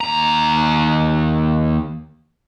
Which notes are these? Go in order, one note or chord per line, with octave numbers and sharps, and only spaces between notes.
D#2 A#5